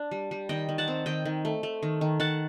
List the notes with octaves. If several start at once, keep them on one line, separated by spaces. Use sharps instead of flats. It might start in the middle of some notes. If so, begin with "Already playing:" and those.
Already playing: D4
G3
G3
D#3 D#5 G5
D#3
F#5 A5
C4
D#3 D#5 G5
D#3
A3
A3
D#3
D#3
D#3 F#5 A5